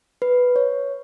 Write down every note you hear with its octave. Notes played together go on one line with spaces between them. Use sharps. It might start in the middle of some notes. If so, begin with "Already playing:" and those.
B4
C#5